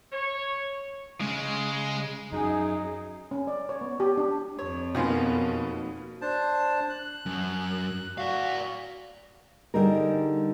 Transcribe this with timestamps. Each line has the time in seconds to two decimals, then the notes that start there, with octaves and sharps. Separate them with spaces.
0.12 C#5
1.21 C#3 G#3
2.32 F#2 D#4 G#4
3.31 C#4
3.47 D5
3.69 C#5
3.81 B3
4.00 G4
4.17 D4
4.59 F2 C#5
4.95 B2 G3 A#3 B3 C#4 D#4 F4 F#4
6.21 D4 C5 A5
6.89 F#6
7.26 F#2
8.18 F#4 D5 F5
9.74 D3 G3 D#4 G#4 A#4